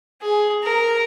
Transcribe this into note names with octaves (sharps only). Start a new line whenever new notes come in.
G#4
A#4